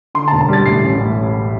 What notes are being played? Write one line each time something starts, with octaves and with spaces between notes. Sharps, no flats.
D3 C6
A5
E1
A5
G3 A6
A2 C7
A1
A2